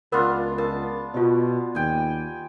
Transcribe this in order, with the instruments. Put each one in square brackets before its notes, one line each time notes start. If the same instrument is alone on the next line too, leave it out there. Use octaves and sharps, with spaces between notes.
[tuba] C#2 [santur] B3 D4 F4 [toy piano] A#4 F5
[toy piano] A#4 [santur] A5
[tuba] B2 [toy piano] F4 G4 D#5
[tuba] D#2 [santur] G5 G#5